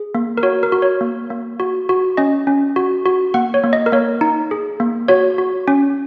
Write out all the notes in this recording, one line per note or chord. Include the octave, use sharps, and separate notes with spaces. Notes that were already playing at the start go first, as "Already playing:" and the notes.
Already playing: G#4
A#3
A#4
F#4 C#5
A#4
F#4
C#5
A#3
A#3
F#4
F#4
C#4 D#5
C#4
F#4
F#4
A#3 F#5
C#5
A#3
D#5
A#4
A#3 C#5
D#4
G#4
A#3
F#4 C#5
F#4
C#4